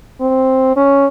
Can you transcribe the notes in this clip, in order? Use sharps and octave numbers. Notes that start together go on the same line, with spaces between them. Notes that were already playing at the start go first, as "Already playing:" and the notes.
C4
C#4